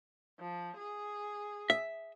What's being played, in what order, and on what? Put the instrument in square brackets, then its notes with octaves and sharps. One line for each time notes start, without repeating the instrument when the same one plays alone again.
[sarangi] F3
G#4
[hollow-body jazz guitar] E5